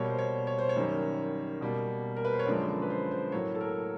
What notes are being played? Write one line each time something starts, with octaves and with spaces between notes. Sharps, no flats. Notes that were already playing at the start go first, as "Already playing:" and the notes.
Already playing: B2 G3 A#3 C#5
C5
C#5
C#5
C5
C#5
F#2 D#3 G3
B2 G3 A#3
A#4
B4
C5
C#5
F#2 D3 F3 G#3 D5
B4
C5
C5
A2 F#3 A#3 C#5
A4
A#4